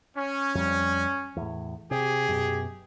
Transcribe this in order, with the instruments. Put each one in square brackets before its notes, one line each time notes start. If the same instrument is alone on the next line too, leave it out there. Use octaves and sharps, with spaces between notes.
[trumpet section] C#4
[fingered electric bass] F2 G3
E2 A2
[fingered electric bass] C3 [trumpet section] G4 G#4
[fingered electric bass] F#2 B2